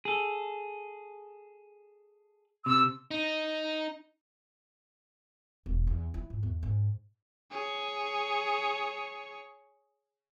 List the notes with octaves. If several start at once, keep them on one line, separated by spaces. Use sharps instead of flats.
G#4 A4
C3 E6
D#4
E1
E2
E4
G#2
E2
G#2
G#4 C#5